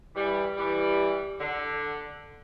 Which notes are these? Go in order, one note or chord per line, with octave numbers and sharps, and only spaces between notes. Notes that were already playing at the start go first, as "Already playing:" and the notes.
E3 G3
E3 G3
D3